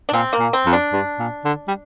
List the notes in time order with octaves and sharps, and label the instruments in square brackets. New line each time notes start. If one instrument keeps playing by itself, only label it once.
[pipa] D4
[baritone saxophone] A#2 [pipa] C4
[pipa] A#3
[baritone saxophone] A#2
[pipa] C4
[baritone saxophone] F2
[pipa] D4
[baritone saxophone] G2
A#2
D3
G3